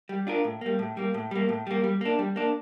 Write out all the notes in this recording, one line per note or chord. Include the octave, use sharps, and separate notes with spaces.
G3
D4 F4 A#4
A2
G3 A#3
A2
G3 A#3
A2
G3 A#3
A2
G3 A#3
G3
A#3 D4
G3
A#3 D4